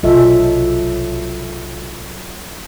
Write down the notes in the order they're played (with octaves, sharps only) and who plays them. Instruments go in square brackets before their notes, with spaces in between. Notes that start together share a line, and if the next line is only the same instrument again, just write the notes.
[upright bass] B1 C3 [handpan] F#3 A4 E5 [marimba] F4 D#5